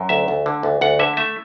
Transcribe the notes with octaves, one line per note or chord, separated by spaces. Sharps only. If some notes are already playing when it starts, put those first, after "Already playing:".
Already playing: F#2
D2 E5
D2
D3
D2
D2 F#5
D3 E5
A3 E5